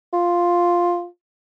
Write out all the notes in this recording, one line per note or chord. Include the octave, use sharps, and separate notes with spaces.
F4